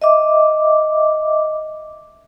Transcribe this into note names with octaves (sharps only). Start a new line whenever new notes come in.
D#5 E5 D6